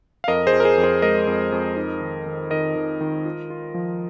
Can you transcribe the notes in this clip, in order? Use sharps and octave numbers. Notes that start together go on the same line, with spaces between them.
F5
F2 A#4 D#5
G#4 C5
F2
A#4
G#4
F2
G#4 C5
G#3 A#4 D#5
F2
F2
D#4
D#3
D#3
D#3 A#4 D#5
D#3
D#3
F4
F4
F3